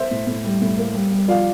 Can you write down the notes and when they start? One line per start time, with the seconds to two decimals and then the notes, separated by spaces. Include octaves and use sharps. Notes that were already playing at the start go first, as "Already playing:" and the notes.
Already playing: C5 E5
0.11 A2
0.27 A2
0.44 G3
0.61 A2
0.78 A#3
0.94 G3
1.12 G3
1.28 F3 D5 F5